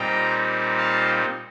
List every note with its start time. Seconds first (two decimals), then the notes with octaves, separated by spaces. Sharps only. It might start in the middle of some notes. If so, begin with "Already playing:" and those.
Already playing: A#2 G3 C4 D#4 G5 A#5
0.77 F5 A5